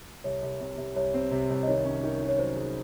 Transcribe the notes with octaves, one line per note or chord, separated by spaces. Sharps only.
C2 C#5
C2
C3
C3
C2 C#5
C4
C3
C2
D#5
D#3 C#5
C#4
D#3
D#3
C#5
F#3 C5
G#4